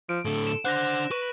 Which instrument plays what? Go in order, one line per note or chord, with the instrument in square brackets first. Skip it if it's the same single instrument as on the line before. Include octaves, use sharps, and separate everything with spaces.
[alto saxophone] F3 [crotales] D7
[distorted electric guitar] A2 D3 [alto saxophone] A4
[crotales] E7
[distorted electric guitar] D4 F#5 [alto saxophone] C5 [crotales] F#6 A#6
[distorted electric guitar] B4 [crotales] C#6